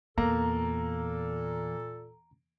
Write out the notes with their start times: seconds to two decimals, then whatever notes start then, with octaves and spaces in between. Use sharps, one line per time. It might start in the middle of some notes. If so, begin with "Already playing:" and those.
0.18 E2 A#2 A#3 A4 A#5